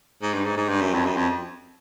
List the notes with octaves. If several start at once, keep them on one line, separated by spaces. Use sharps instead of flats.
G#2
G2
G#2
G#2
G2
F#2
F2
F#2
F2